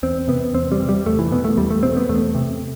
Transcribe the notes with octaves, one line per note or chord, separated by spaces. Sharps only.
E2 C4
C3 B3
E2 C4
G3
C3
G3
E2 A3
E3
B2 B3
A3
E2 G3
A3
B2 C4
B3
E2 A3
C3